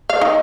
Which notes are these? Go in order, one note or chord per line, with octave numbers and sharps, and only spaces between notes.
F5
D#4